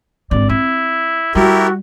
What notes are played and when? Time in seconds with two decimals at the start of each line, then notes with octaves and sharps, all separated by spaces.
0.31 G#1 D3 D5
0.49 C4 E4
1.35 G3 A3 E4 F#4 G4 A#4